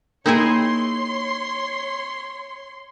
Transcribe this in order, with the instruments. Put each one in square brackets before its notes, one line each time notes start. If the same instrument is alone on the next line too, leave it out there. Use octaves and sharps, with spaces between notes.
[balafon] A#3 A#4 [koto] D#4 E4 G#4 [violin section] C#5 C6